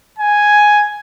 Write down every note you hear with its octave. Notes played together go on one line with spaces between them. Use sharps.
G#5